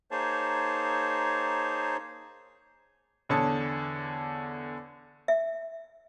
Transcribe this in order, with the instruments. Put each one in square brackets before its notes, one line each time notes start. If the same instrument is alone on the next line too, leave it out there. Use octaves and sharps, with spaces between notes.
[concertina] A#3 D#4 G#4 C5 C#5 A5
[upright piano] E2 D3 C#5 A5 D#6 C#7
[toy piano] E5